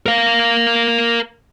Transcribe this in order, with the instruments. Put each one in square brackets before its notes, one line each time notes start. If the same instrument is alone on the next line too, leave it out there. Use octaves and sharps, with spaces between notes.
[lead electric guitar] A#4 F5